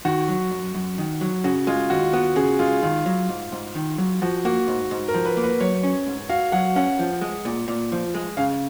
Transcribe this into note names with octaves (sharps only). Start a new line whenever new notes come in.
D#3 F#4
F#3
F#2
F#2
D#3
F#3
C#3 F#4
G#3 F4
D#2 F#4
B3 F#4
C#3 G#4
G#3 F4
D#3 F4
F#3
G#2
G#2
D#3
F#3
F3 F#4
A#3 F#4
G#2
G#2
A#4
F3
B4
A#3
B4
F#3 C#5
C#4
G#2
F#4 F5
F#3 F#5
C#4 F#5
F3
G#3
A#2
A#2
F3
G#3
C#3 F5